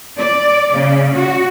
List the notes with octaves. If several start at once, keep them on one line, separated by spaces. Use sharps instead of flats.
D5
C#3
F#4